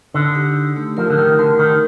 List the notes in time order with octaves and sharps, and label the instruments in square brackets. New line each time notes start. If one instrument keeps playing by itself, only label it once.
[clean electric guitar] D3 [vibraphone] D#4
[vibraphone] G4
G4
A3
[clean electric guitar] F3 [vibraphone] A#4
[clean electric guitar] D3
[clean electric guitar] D#3 [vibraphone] A#4
[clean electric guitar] D3 [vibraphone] A#4
[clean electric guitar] D#3 [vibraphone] G4